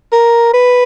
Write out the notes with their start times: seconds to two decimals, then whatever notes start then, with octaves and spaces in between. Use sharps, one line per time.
0.12 A#4
0.54 B4